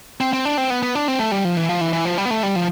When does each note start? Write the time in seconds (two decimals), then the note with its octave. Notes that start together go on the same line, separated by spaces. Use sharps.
0.21 C4
0.33 C4
0.45 D4
0.58 C4
0.70 B3
0.83 B3
0.95 D4
1.08 C4
1.19 A3
1.31 G3
1.45 F3
1.57 E3
1.69 F3
1.81 E3
1.93 E3
2.05 F3
2.18 G3
2.25 B3
2.30 A3
2.43 G3
2.56 F3